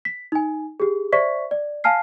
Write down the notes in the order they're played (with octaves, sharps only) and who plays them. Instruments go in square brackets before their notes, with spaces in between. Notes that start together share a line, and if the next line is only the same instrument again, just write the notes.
[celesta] B6
D#4 G#5
G4 G#4
C5 D5 E5 C#6 B6
D5
F5 G#5 A5 F6 C7